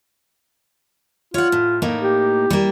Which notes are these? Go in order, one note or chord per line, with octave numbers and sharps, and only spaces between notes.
F4 C#5 F#5
A2
A2 A#3 D#4
G4
G3 A#3